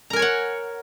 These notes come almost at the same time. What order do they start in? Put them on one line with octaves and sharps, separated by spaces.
A#5 A#4 G#5 C#5 F#5